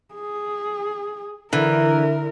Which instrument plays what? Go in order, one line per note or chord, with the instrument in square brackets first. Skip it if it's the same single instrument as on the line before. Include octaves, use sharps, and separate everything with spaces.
[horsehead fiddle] G#4
[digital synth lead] D3 [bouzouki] E3 [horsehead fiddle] E4 A#4